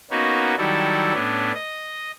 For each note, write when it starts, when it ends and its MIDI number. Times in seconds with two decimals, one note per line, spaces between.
0.11 0.55 58
0.11 0.55 59
0.11 0.55 61
0.11 0.55 63
0.11 0.55 66
0.57 1.13 51
0.57 1.13 54
0.57 1.13 55
0.57 1.13 64
0.57 1.13 69
1.13 1.52 45
1.13 1.52 59
1.13 1.52 61
1.13 1.52 62
1.54 2.11 75